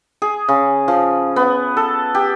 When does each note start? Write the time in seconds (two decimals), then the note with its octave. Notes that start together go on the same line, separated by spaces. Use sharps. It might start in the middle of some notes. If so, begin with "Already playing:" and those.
0.22 G#4
0.49 C#3
0.88 F3
1.36 B3
1.77 A4
2.15 G4